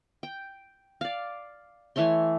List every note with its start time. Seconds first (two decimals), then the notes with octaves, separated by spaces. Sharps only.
0.23 G5
1.01 D5 F5
1.96 E3 A3 C#5 C6